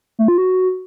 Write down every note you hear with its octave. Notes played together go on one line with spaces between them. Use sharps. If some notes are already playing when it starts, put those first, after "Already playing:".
A3
F4
F#4